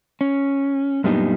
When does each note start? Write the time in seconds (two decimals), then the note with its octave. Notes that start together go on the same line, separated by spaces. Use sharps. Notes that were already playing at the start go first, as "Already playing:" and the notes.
0.21 C#4
1.04 F#2 A#2 G3 B3 D4 D#4